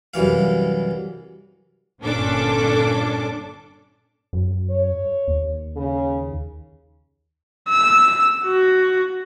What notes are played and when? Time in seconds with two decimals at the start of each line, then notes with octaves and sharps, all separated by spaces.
0.14 C2 F#2 E3 F5
2.03 G1 A#2 C#4 D4 A4 D6
4.33 F#2
4.70 C#5
5.28 D#2
5.76 C#3
7.69 E6
8.45 F#4